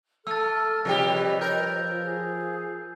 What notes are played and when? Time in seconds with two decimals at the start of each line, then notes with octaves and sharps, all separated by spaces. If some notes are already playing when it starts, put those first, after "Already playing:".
0.27 A3 A4 E6 F6 A6
0.85 C3 F3 G3 G4 B4 C#5 D#5
1.41 A#4 G6
2.03 G#4